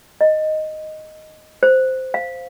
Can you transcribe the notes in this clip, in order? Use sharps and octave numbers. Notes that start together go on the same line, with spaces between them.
D#5
C5
F5